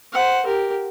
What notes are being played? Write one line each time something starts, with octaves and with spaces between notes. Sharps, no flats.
C5 F#5
G4 A#4